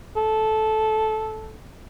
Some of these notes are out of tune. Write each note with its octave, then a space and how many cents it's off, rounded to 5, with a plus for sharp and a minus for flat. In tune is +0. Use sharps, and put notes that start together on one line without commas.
A4 -15